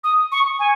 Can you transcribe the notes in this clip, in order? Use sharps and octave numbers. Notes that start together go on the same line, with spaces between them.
D#6
C#6
G#5